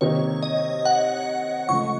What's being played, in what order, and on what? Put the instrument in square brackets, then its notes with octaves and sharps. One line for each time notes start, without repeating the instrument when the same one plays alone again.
[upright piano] C3 D#3 A#3 D#4 [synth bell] C#5
[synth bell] D#5
F#5
[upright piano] C#2 C#3 F3 A3 [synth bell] C#6